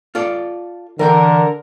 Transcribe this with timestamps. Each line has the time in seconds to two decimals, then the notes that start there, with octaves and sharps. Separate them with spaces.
0.15 F4 A4 D5
0.99 D3 E3 A#4 D5 G5